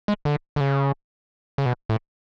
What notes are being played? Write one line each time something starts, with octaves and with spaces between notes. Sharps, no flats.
G#3
D3
D3
C#3
C#3
B2
A2